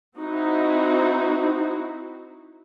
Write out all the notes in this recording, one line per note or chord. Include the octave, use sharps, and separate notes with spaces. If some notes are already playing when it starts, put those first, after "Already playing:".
C4 D#4 E4 F#4